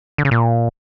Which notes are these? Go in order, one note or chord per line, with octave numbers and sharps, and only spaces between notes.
D3
C#3
A#2